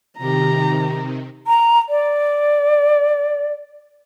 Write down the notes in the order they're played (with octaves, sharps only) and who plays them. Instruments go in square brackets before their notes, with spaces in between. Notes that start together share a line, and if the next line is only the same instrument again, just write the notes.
[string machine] C3 D#3 [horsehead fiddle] G4 A#5
[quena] A#5
D5